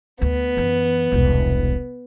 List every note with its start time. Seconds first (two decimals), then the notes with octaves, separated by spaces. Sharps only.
0.22 D2 B3
0.57 F#2 E3
1.12 E1 C2